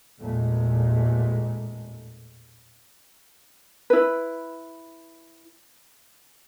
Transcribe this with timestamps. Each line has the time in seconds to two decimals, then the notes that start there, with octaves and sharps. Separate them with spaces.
0.20 A1 E2 A#2 G#3 A3
3.90 E4 B4